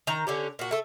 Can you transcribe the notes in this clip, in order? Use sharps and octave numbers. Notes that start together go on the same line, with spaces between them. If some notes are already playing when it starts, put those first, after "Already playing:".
D#3 A#5
D3 C#4 G4
A#2 F#4
A3 A4